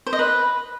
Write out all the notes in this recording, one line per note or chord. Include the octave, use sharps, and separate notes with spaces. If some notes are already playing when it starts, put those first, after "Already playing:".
C5
D#5
B4